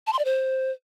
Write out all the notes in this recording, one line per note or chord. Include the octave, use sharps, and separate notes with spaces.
A5
C6
D5
C5